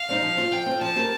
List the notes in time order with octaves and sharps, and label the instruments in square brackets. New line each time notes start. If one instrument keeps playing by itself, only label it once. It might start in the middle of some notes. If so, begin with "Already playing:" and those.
Already playing: [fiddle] F5
[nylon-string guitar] G3 C4 D#4
F3
C4 F4
[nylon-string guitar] F3 [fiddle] G5
[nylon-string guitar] C4
F4
[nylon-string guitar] F3 [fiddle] A5
[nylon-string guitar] C4 G4 A#4